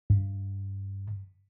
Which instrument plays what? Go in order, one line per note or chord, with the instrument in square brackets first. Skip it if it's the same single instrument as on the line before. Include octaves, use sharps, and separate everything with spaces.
[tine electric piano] G2